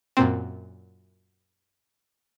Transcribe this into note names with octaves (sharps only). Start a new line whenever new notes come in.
F#2 A#2 C4